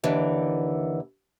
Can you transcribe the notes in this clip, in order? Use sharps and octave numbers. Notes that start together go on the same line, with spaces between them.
D#2 D3 E3